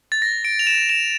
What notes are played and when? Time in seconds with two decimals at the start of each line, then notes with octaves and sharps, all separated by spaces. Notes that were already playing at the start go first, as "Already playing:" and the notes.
0.12 A6
0.22 A#6
0.45 D7
0.59 F7
0.67 E7
0.89 E7